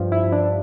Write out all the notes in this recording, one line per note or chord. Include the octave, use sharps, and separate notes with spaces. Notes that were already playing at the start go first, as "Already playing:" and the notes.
Already playing: G2 F3
E4
D4